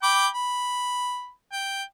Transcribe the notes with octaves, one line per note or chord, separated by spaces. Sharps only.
G5 B5 D6
B5
G5